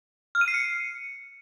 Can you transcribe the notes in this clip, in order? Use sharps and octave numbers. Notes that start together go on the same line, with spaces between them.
F6
D#7
C7
C#7